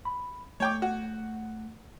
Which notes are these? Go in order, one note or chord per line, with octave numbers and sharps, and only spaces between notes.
B5
A3 C#5 G5 D6
F#4